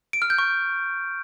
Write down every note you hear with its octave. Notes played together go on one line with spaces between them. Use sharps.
D7
F6
G6
C#6